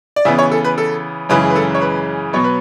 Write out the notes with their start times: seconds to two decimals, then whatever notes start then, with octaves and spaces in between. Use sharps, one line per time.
0.16 D5
0.25 C#3 E3 B3 E5
0.39 C#5
0.51 A4
0.64 B4
0.78 A4
1.29 F#2 C#3 E3 G#3 B4
1.42 G#4
1.50 B4
1.56 A4
1.75 C#5
1.81 B4
2.33 B2 F#3 B3 C#5
2.44 B4